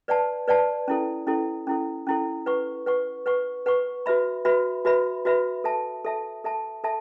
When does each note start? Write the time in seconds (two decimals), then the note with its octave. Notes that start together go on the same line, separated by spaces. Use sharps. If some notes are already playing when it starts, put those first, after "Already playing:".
0.08 B4 D5 F#5 A5
0.48 B4 D5 F#5 A5
0.88 C#4 E4 A4
1.27 C#4 E4 A4
1.67 C#4 E4 A4
2.07 C#4 E4 A4
2.46 B4 F#5 C#6
2.86 B4 F#5 C#6
3.26 B4 F#5 C#6
3.66 B4 F#5 C#6
4.06 F#4 B4 E5 B5
4.45 F#4 B4 E5 B5
4.85 F#4 B4 E5 B5
5.25 F#4 B4 E5 B5
5.64 A4 E5 A5
6.04 A4 E5 A5
6.44 A4 E5 A5
6.84 A4 E5 A5